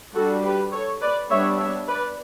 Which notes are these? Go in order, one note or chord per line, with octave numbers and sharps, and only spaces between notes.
G3 D4 F#4 A4
G4 B4
A4 C#5
B4 D5
G3 B3 D4 C#5 E5
C#5 E5
B4 D5